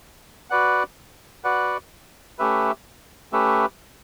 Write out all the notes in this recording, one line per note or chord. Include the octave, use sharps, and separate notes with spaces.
F#4 B4 D5 F#5
F#4 B4 D5 F#5
A3 C#4 G4 B4 E5
A3 C#4 G4 B4 E5